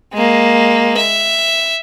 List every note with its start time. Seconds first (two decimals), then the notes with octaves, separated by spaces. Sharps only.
0.13 G#3 A#3
0.97 E5